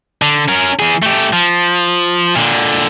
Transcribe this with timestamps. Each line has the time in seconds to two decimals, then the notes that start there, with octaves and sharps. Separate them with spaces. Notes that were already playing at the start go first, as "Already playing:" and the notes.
0.22 D3
0.48 C#4 A#4
0.79 E3 G#4
1.02 A3 G4
1.33 F3
2.36 A#2 D3